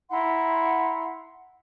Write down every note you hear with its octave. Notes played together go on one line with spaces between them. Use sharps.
E4 F#5 A#5 C6